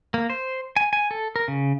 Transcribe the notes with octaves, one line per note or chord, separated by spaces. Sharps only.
A#3
C5
G#5
G#5
A4
A#4
C#3